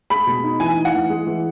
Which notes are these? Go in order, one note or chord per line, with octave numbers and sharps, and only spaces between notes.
G#3 B5
B2
D#4
E3 G#5
D#4
F#5
E3
G#3
E3